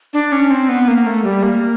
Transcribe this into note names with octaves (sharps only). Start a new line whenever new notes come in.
D4
C#4
C4
B3
A#3
A3
G3
A#3